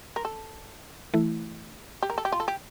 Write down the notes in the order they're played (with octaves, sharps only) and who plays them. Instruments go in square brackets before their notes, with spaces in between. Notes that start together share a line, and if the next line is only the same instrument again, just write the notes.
[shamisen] A#4
A4
[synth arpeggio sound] E3 A3 E4
[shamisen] G4
A#4
A4
G4
F4
A4
G4